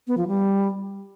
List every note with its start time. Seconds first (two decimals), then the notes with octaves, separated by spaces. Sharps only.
0.07 B3
0.18 F3
0.28 G3